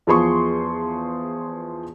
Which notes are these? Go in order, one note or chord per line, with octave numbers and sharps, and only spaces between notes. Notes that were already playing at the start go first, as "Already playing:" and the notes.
E2 F3 G#4 C6 C#6